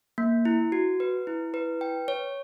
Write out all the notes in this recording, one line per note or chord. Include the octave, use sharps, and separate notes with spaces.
A#3
E4
F#4
B4
E4
B4
G5
C#5